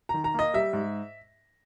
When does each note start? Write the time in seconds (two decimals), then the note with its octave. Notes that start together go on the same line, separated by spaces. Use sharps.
0.09 D#3 A#5
0.24 A#5
0.34 A#3 D#5
0.54 G3 E5
0.73 G#2